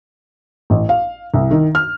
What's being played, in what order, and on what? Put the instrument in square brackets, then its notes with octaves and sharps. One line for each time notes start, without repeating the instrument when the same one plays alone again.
[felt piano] A1
F5
C2
D#3
F6